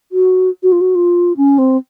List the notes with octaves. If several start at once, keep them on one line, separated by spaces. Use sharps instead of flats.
F#4
F#4
F4
F#4
F4
C#4
C4